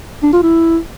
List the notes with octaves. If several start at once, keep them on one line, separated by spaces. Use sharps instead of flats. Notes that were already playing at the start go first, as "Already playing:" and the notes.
D4
F4
E4